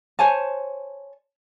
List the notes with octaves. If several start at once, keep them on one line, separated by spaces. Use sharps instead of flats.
C5 C#5 G#5 A5